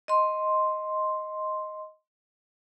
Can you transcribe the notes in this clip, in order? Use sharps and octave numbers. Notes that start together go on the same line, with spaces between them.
D#5 C6